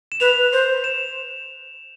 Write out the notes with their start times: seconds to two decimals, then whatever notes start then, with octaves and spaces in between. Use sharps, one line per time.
0.12 E7
0.20 B4 F7
0.53 C5
0.84 E7